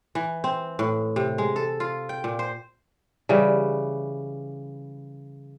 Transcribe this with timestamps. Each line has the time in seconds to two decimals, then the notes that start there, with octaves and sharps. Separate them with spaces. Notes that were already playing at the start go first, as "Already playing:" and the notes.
0.15 E3
0.44 C4
0.79 A2
1.16 C3
1.38 G#3
1.56 A4
1.80 F4
2.09 G5
2.24 A#2
2.39 C5
3.29 C#3 E3 G3